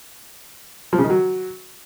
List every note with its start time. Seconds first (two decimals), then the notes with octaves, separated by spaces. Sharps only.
0.93 F3
0.98 C#3
1.04 D#3
1.10 F#3